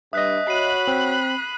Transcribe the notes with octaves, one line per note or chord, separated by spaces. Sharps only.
G2 D#5 E5 D#6 F#6 B6
F#4 C#5 B5 F#6 C7 D#7
C4